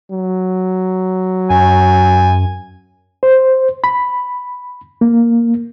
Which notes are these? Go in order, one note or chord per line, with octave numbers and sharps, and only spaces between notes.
F#3
F#2 G#5
C5
B5
A#3